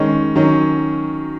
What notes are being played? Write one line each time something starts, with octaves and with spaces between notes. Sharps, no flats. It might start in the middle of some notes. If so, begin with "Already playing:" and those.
Already playing: D#3 G#3 C#4
D#3 F#3 C#4